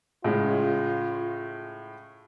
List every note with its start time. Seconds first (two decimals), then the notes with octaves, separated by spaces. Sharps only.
0.24 A2 C#3 G#3 F4